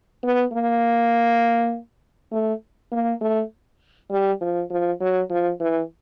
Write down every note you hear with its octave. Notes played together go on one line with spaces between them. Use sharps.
B3
A#3
A3
A#3
A3
G3
F3
F3
F#3
F3
E3